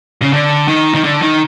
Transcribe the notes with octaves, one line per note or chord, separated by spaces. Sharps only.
C#3
D3
D#3
D#3
D3
D#3